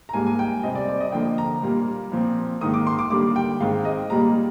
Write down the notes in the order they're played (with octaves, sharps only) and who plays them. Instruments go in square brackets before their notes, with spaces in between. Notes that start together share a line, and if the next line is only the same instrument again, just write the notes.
[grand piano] A#5
G#2 G3 A#3 G#5
G#5
G5
C3 G3 C4 D#5
D5
D5
D#5
D3 F3 A#3 G5
A#5
A#2 G3 A#3
A#2 F3 C4
G#2 D#3 A#3 D#6
D6
C6
D6
D3 G3 A#3 D6
G5
G#2 D#3 G#3 C4 F5
D#5
A#2 G3 A#3 A#5